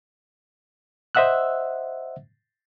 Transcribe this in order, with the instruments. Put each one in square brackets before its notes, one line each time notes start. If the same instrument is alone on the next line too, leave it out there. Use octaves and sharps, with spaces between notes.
[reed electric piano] C5 D#5 E5 F#5 E6 F#6